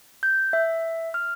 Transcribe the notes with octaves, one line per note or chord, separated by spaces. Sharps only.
G6
E5
F6